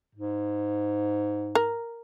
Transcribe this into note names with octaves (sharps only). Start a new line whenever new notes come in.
G#2
A#4